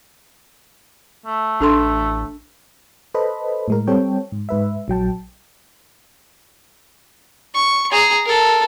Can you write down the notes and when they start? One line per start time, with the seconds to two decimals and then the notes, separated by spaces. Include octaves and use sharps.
1.26 A3
1.60 A1 D4 A4 C6
3.14 A4 B4 C5 D#5 B5
3.68 A2 G#3 A#4
3.87 G3 C4 A4 C#5 G5
4.32 G#2
4.49 G#2 B4 E5
4.88 A#1 F#3 G5 A5
7.54 C#6
7.91 G#4 A#5
8.26 A4 A#4